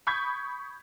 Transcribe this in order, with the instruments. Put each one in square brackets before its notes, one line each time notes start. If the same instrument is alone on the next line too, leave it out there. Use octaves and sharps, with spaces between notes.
[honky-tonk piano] B5 C#6 D#6 G6 G#6 B6